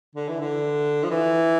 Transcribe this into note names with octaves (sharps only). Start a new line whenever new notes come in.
D3
E3
D3
F3
E3